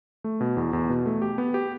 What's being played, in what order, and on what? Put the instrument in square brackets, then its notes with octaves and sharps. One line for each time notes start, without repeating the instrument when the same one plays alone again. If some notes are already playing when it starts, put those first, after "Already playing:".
[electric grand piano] A3
B2
E2
E2
B2
A3
G4
B3
G4